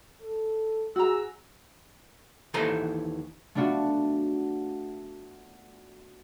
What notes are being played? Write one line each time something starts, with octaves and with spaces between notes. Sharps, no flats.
A4
F#4 G#4 A#5 E6
D#2 E3 A4 C5 A#5 C6
A3 B3 D4 F4 F#4